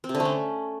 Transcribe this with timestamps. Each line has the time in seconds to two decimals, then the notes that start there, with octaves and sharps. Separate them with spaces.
0.04 C4
0.09 C3
0.15 D3
0.20 A3
0.25 C#4